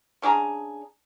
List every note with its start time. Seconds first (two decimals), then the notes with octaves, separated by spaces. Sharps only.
0.22 C#3 D4 G#4 A#5